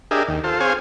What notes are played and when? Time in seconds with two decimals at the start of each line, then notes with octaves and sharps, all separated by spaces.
0.11 D4 G4 G#4 A#4 D#5 E5
0.28 D#2
0.44 F4 A4 C5
0.60 C4 G#4 C5 C#5 F5 G#5